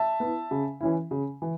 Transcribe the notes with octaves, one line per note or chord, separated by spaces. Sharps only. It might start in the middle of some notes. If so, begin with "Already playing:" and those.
Already playing: E5 A5
B3 E4
C#3
E3 C#4 E4
C#3
E3